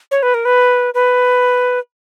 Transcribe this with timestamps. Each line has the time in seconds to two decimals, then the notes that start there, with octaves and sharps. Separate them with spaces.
0.11 C#5
0.23 B4
0.34 A#4
0.45 B4
0.94 B4